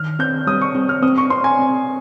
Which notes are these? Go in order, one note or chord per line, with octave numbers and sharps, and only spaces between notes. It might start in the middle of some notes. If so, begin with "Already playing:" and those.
Already playing: D#3 F6
C4 G6
G3 D#6
C#6
C4
F6
C4 D#6
C#6
C4 C6
G#5
C4